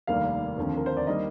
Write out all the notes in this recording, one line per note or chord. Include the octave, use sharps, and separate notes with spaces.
F1 D#2 D#3 G3 A#3 F5
D#2 D3 F3 C4
A#4
C5
D5
D#3 G3 A#3 D#5